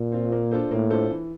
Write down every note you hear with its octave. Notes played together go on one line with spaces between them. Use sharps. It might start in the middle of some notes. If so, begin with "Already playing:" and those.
Already playing: A#2
C4 F4
A#3
D4 F4 A4 C5
A2 A#3
D4 F4 A4 C5
E3